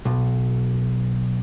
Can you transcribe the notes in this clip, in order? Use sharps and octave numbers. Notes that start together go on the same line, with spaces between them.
B1